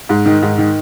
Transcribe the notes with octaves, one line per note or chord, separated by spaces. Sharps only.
G#2
D#3
G#2
D#3